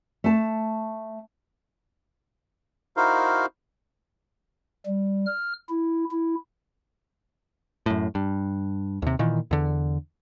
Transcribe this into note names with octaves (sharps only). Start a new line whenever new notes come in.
A3 A5
D#4 E4 F#4 A#4 C5 F5
G3
F6
E4
E4
F#2 A2
G2
D#2 C3
A#2 D#3 E3
E2 D3